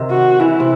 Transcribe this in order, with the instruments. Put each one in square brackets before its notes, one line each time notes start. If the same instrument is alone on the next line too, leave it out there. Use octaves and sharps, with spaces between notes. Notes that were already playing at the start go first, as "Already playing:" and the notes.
Already playing: [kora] C3 D#3
[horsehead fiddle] F#4
[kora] E3 [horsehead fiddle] E4
[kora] C3